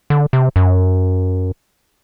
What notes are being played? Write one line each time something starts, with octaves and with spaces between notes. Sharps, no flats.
D3
C3
F#2